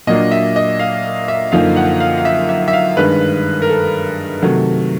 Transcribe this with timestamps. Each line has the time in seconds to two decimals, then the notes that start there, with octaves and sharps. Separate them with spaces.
0.07 A#2 F#3 A#3 D4 D#5
0.31 E5
0.56 D#5
0.79 F5
1.28 E5
1.52 F#2 D3 F3 A#3 D#4 F5
1.76 F#5
2.00 F5
2.18 F5
2.25 E5
2.49 E5
2.68 E5
2.73 F5
2.97 G2 D#3 G#3 B4
3.62 A#4
3.69 A4
4.42 C3 D#3 F#3 A3